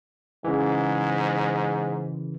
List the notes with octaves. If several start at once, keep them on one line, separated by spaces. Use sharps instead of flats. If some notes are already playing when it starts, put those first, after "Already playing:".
G#2 C#3 E3